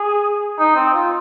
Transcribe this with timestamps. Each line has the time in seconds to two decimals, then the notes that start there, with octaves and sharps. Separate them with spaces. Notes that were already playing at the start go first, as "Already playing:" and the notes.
Already playing: G#4
0.59 D#4
0.76 C4
0.94 F4